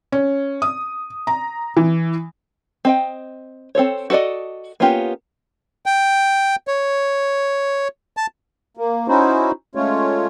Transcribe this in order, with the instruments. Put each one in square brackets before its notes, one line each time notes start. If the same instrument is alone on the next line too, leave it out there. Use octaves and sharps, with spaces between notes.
[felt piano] C#4
D#6
A#5
E3
[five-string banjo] C4 D#5 G5
C4 A4 C5 C#5
F#4 A4 B4 D5 D#5
A#3 B3 C#4 F4 G4
[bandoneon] G5
C#5
A5
[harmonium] A#3
C#4 D#4 E4 F#4 C5
G#3 A3 C#4 F4 C#5